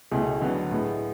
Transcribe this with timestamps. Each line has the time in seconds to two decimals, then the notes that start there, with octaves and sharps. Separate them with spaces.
0.11 C#2 B2 A3 E4 G#4
0.41 D3 F#3 B3
0.71 A2 G#3 B3